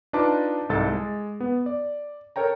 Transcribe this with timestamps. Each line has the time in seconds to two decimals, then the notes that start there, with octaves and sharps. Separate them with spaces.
0.13 D4 D#4 F4 B4 A5 D6
0.69 C2 G#2 A4 A6
0.92 G#3
1.40 B3
1.66 D5
2.36 A4 A#4 C#5 G5 A#5